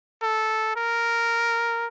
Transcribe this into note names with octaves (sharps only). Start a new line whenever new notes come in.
A4
A#4